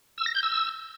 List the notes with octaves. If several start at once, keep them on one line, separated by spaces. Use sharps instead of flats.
E6
A#6
G6
E6